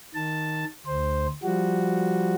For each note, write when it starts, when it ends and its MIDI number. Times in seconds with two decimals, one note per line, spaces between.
0.14 0.64 51
0.14 0.64 81
0.86 1.27 38
0.86 1.27 72
1.43 2.35 53
1.43 2.35 55
1.43 2.35 66